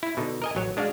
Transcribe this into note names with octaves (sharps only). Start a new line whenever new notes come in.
E4
B2 D3 D#4
A#4 D#5 G#5
A1 F#3 C#5
G#3 D4 F#4 F5